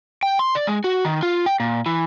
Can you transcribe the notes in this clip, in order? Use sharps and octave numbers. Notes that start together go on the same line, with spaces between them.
G5
C6
D5
G#3
F#4
D#3
F4
G5
A#2
E3